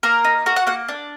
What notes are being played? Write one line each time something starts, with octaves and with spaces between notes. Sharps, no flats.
A#3 A#4
D#4
F#4 A#4
F#5
A#3 F#5
D4